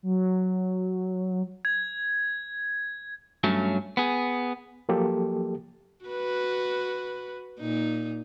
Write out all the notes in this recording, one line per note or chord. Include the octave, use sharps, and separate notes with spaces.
F#3
G#6
G2 F#3 A3 C#4
B3 G#4
F3 F#3 A#3 G4 A4
F#4 B4
A#2 D#4